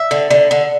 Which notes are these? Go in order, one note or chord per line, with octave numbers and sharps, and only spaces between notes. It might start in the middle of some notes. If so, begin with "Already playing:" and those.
Already playing: E5
D3
D3
D3